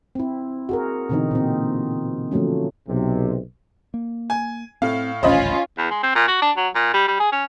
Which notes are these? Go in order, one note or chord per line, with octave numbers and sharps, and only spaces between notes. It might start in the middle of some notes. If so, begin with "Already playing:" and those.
C4 E4
F#4 G#4 A#4
B2 D3 E3 C4 D#4
A#2 C4
D3 F3 F#3 A3 C#4
B1 C3
A#3
G#5
A2 C4 F5
D#1 A1 D2 C#4 F4 C5 D#5 B5
E2
G#3
C4
A#2
F#4
D4
F#3
A#2
G3
G3
G#4
C#4